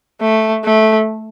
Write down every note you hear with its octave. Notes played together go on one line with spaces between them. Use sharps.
A3
A3